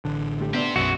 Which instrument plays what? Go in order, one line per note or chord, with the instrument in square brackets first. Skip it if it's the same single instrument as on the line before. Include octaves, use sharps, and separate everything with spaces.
[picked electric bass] A1 D3
[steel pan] A3 G4
[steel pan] B3 D4 E5 [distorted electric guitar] G4 C5
[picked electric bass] B1 F#2 [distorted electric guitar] E3 G#3 [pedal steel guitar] F#4 [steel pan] E5